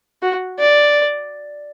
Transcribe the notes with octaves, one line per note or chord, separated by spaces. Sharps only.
F#4
D5